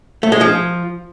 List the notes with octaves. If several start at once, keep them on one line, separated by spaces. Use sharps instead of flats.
A3
G#3
F3